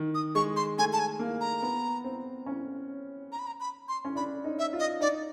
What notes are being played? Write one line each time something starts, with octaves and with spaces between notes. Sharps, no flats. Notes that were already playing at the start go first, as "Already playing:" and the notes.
Already playing: D#3
D#6
G#3 C#6
C6
A3 G#5
A5
G#5
A#3
A#5
B3
C4
C#4
A#5
B5
A#5
B5
C6
C#4
D4 B5
D#4
E5
F4
D#5
D#4 D5